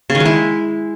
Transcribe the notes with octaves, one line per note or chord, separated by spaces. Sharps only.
C#3
D#3
G#3
E4